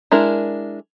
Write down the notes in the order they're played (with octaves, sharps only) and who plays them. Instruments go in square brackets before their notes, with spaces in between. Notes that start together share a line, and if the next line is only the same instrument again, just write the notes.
[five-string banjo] G#3 D4 E4 A#4